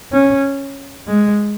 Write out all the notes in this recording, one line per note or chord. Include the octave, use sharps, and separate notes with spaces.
C#4
G#3